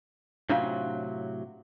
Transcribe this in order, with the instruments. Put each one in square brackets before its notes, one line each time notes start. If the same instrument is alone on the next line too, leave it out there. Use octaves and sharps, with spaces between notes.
[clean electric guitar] A2 C3 F#3 [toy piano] D4 F4 F5